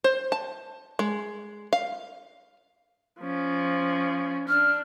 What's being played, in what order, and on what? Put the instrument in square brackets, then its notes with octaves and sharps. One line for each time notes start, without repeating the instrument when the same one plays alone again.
[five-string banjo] C5
A5
G#3
F5
[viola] F3 C#4
[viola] D4 [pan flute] F6